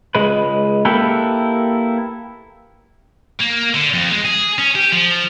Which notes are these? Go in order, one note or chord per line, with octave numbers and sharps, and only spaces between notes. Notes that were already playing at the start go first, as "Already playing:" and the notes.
C#2 G#3 B4
A#3 E4 G4 A4 B4
A#3
D3
F2
G#3
G#4
C#4
G4
F3